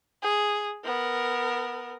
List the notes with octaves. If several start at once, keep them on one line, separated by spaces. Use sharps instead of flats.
G#4
B3 A#4